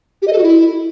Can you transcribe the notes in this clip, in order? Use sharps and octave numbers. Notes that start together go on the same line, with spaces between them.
G4
D#5
A4
F#4
E4